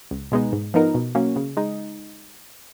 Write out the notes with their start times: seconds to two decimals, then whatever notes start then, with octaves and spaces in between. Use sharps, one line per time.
0.11 C#2
0.32 B2 G#3 B3 D#4
0.52 G#2
0.74 F3 B3 D#4 A#4
0.95 B2
1.15 F#3 A#3 C#4
1.36 C#3
1.57 G#3 D#4